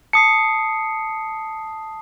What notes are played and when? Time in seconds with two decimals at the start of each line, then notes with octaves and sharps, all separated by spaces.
0.13 A5 D#6 C7 C#7